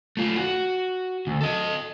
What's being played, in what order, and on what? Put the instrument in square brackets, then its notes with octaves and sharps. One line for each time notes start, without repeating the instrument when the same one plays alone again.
[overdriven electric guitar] A3 F4
F#4
D2
A4 D#5